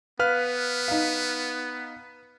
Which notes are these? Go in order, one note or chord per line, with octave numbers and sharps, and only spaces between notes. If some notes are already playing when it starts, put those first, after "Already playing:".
B3 B4 F5 F6
D#4 F5